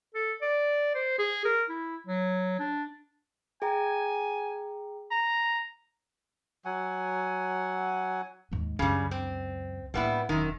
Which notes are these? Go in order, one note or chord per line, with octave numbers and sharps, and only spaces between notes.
A4
D5
C5
G#4
A#4
E4
F#3
D4
G#4 G5 G#5 A#5
A#5
F#3 F#5 G#5
D#2 G#2
C#2 F#2 C#3 G3
C4
A2 G3 A#3 B3 E4
E1 F#2 D#3